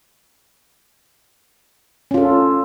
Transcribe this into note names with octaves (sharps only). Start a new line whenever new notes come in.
C#4 F4 A4